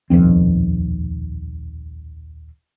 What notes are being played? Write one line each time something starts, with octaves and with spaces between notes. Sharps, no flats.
D#1 B1 F2 C4